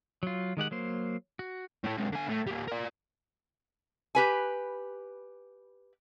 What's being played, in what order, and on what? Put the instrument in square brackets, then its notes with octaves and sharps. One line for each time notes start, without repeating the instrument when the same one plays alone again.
[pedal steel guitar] F#3 F4
D#3 G#3 G4 F#5
F#3 A#3 C5
F#4
[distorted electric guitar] A2 A3
C3 G#3
D3 G#5
A2
G3 A#3
A#4 D5
[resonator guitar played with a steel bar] G4 B4 G#5